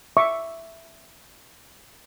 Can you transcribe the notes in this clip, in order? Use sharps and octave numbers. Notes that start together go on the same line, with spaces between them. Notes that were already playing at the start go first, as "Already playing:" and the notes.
E5 C#6 D6